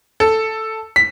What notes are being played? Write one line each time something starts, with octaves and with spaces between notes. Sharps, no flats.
A4
B6